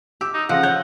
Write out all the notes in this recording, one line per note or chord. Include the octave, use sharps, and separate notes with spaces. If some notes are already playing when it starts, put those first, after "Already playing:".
G4 E6
D#4
C#3 F3 F#5 A#6
C#5 G6